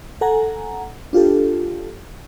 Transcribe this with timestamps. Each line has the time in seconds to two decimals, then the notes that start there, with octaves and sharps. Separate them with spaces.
0.21 A4 F#5 G#5 A#5
1.13 D4 F4 G4 A4